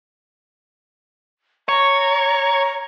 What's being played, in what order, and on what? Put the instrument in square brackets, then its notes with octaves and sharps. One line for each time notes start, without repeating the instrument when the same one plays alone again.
[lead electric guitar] C#5 [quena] A#5